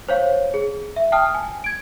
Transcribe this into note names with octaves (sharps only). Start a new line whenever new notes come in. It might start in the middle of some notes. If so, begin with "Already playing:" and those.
C5 C#5 F5
G#4
E5
G5 A5 D#6 F6
G#5
G#6 D7